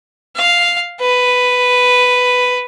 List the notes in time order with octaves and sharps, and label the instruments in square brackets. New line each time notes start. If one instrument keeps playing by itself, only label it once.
[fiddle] F5
B4